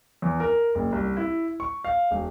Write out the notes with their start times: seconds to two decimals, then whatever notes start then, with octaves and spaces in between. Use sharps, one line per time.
0.22 E2
0.40 A#4
0.75 F#1
0.92 C2
1.17 E4
1.60 C#6
1.84 F5
2.11 E1